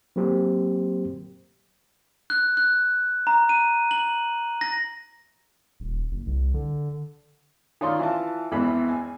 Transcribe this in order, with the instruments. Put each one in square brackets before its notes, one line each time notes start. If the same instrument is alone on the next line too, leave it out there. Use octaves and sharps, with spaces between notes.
[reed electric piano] F#3 A#3 C4 G4 C5
[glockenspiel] F#6
F#6
A#5
D#7
F#7
A#6
[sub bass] D#1
F#1
C2
D3
[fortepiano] D#3 F4 C#5 D5 C6
E3 F4 A5
G#1 E2 E3 B5
G#5